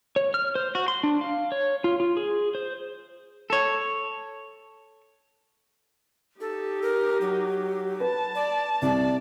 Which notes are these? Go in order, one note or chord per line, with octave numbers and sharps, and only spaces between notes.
C#5
F6
C5
F#4
C6
D4
F5
C#5
F4
F4
G#4
C5
A4 C#5
D#4 G4 A4
A#4
F#3
B4 A5
D5
C2 D5